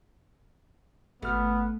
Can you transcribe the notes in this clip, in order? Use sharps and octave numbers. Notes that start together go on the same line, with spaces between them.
G#1 A3 B3 F6